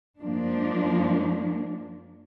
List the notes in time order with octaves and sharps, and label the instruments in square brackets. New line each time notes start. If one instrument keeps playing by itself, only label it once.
[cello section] F#2 F3 G#3 A#3 D4